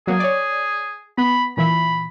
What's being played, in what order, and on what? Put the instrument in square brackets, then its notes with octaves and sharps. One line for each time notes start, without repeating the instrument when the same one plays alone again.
[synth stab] F#3 A#3 [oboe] G#4
[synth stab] C#5 D5
[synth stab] B3 [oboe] B5
[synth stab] A#2 E3 E5 [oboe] B5